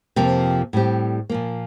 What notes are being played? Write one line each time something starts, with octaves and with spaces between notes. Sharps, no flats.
F2 C3 F3 A#3 F4
A2 G3 C4 G4
A#2 F3 A#3